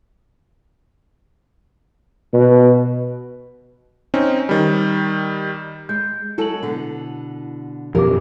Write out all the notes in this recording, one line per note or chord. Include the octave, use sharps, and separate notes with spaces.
B2
C4 C#4 D#4
D#3 G3
G#3 G6
F#3 G#3 E4 A4 F#7
B2 D3
F#2 B2 F3 G4 A#4 D6